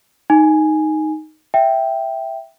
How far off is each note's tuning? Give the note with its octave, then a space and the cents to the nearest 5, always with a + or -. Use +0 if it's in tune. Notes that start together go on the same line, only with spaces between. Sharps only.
D#4 +0 G#5 +0
E5 +0 G5 +0